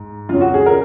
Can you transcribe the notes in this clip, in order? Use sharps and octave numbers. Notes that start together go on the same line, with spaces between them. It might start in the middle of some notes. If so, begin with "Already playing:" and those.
Already playing: G#2
F2 C#3 F#3 F4
F#4
G#4
A#4